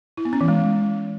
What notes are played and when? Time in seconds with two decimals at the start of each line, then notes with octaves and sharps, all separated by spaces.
0.17 E4
0.25 B3
0.33 C#4
0.41 E3
0.48 G#3